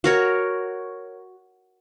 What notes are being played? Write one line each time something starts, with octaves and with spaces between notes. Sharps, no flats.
F#4 A#4 C#5